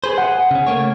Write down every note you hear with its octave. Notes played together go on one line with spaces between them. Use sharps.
G#4 B4 C5
G#4 F#5
C#3 C#4
A3 A#3 C#5